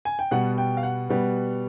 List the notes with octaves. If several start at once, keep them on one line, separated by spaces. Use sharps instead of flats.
G#5
G5
B2 G3 B3 F#5
G5
F5
F#5
B2 G3 B3